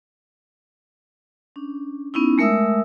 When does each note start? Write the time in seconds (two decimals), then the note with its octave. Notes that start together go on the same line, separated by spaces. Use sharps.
1.56 C#4 D4
2.14 B3 C#4 D#4 E4
2.38 G#3 A3 A#4 E5 D#6 E6